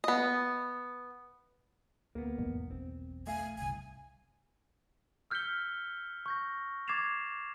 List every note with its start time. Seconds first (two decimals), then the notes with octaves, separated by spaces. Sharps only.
0.04 B3 D#5
2.15 D2 A#3 B3
2.38 B1 E2 G#2
2.71 G#1 C4
3.27 A3 E5 F5 G#5
3.58 G1 C2 G#5
5.31 E6 F6 G6 B6 C#7 G7
6.26 C#6 G6 A#6
6.88 D6 G#6 A6 C7 E7 F7